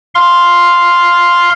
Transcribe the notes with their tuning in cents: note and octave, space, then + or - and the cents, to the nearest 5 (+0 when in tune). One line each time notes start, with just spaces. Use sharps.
F5 +0 C6 +0